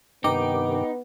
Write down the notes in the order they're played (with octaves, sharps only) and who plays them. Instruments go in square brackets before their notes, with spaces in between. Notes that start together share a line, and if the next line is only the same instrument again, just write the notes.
[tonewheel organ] G2 C3 D#3 [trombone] B3 [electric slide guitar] D#4 [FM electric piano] G5 D6